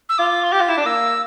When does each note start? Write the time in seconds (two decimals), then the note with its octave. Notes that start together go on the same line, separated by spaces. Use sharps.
0.09 E6
0.18 F4 D6
0.44 C6
0.52 G4 D6
0.60 F4
0.68 E4
0.77 D4 D6
0.85 A#3 E6